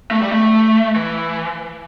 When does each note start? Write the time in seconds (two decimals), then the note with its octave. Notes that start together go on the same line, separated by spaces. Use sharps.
0.11 A3
0.22 G3
0.32 A3
0.96 E3